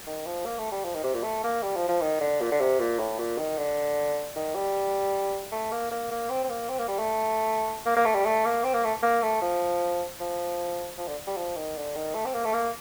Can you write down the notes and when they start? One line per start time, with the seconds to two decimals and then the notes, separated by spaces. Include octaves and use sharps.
0.07 D#3
0.26 F3
0.46 A#3
0.58 A3
0.71 G3
0.85 F3
0.94 D#3
1.04 C3
1.14 A#2
1.23 A3
1.44 A#3
1.63 G3
1.76 F3
1.88 F3
2.01 D#3
2.21 D3
2.41 A#2
2.52 D3
2.60 C3
2.80 A#2
2.99 A2
3.19 A#2
3.38 D#3
3.57 D3
4.36 D#3
4.55 G3
5.52 A3
5.72 A#3
5.91 A#3
6.11 A#3
6.30 C4
6.44 C4
6.49 A#3
6.69 C4
6.79 A#3
6.88 G3
6.99 A3
7.86 A#3
7.96 A#3
8.05 A3
8.15 G3
8.26 A3
8.45 A#3
8.64 C4
8.74 A#3
8.84 A3
9.03 A#3
9.22 A3
9.42 F3
10.20 F3
10.98 F3
11.07 D3
11.27 G3
11.37 F3
11.56 D#3
11.76 D3
11.96 D#3
12.15 A3
12.25 C4
12.34 A#3
12.45 A3
12.53 A#3